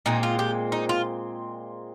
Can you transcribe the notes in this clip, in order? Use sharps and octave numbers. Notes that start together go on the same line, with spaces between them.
A#2 G#3 C4 D#4
F4
G4
D#4
F4